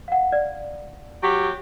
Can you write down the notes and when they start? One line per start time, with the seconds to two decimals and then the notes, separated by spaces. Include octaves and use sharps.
0.08 F5 F#5
0.32 D5
1.22 F#3 G4